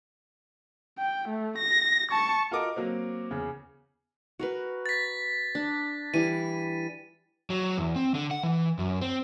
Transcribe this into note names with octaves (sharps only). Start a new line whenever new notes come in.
G5
A3
A#6
A5 C#6
F4 F#4 A4 A#4 D#5 D6
F#3 A#3 C4
E2 C#3
F#4 A#4 B4
A6 B6
D4
E3 G3 D#7
F#3
E2
C4
D3
F#5
E3
F#2
C4